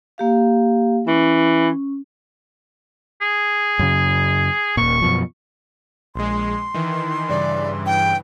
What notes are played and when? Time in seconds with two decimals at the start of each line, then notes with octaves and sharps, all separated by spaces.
0.18 A#3 G4 F5
1.07 E3 C#4
3.21 G#4
3.79 F#2 C#3
4.77 D#1 A#2 C#6
5.02 F#2 B2 F3
6.16 A#1 G#3 C6
6.74 D#3 E3
7.29 G2 C#3 E3 D5
7.86 G5